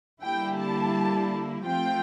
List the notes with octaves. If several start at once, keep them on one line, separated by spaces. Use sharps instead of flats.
D3 G3 A#3 E4 G4 G5
A5
F3 A3 C4 F4 G5